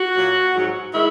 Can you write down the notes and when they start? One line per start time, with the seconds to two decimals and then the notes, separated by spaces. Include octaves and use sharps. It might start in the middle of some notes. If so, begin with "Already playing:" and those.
Already playing: F#4
0.17 A#2 F#3
0.55 G#2 F#3
0.93 D#3 G#3 E4